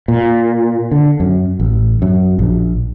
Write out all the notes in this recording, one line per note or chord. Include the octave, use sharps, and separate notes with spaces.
A#2
D3
F#2
A1
F#2
A#1